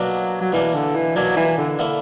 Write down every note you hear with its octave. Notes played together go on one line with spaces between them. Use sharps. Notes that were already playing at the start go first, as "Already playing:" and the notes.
Already playing: B2 F#3 A#3 D4
F#3
B2 E3 A#3 D4
D3
E3
B2 F#3 A#3 D4
E3
D3
D3 A#3 E4